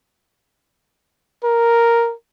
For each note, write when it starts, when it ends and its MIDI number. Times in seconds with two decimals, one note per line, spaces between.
1.44 2.13 70